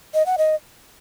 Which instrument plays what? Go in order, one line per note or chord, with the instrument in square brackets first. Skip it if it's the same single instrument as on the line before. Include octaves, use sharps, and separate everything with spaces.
[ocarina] D#5
F#5
D#5